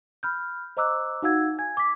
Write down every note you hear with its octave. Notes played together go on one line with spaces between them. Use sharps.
B5 F6 G6
C5 D#5 A#5 D6 E6 F#6
D#4 F#4 F5 F#5 E6 G#6
G#5 G#6
D6 B6